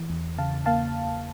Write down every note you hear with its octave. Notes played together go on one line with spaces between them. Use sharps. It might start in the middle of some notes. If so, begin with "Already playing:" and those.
Already playing: E3
E2
C#3 F5 A5
A#3 F5 A5